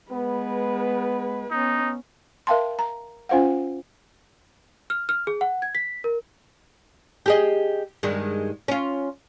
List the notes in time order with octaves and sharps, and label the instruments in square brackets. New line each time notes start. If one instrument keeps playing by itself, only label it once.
[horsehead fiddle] G#3 B4 [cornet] B3
[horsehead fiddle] B3 C#4 [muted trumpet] D#4
[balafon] A#4 E5 F5 G5 A5 C6
A#5
C#4 F4 C5 F5 F#5
[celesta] F6
F6
G#4
F#5
G#6
B6
A#4
[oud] G4 G#4 D#5
G2 D#3 G#3
C#4 F4